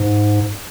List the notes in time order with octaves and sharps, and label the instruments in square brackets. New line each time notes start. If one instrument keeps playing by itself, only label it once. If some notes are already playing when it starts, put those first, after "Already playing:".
Already playing: [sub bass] G#2